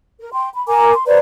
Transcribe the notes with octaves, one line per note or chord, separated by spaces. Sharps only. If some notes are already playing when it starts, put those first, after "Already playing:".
A#4
G5 C6
B5
A#4 G#5 A#5 D6
C6
B4 C5 D5 A#5